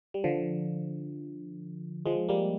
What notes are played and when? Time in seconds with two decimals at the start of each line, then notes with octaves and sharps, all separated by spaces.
0.14 G3
0.24 D3 F3
2.06 F3 G#3
2.29 G3 A#3